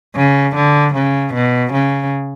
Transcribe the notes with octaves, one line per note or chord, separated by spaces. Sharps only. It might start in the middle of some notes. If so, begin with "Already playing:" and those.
C#3
D3
C#3
B2
C#3